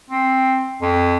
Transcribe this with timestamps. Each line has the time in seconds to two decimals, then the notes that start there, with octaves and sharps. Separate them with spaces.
0.10 C4
0.81 F2